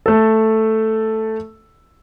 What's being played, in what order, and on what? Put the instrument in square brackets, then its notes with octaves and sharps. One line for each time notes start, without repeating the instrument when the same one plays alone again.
[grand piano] A3 A4